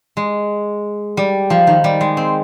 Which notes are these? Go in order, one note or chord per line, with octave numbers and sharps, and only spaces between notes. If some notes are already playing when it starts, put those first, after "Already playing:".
G#3
G3
F3
D#3
G3
G#3
C4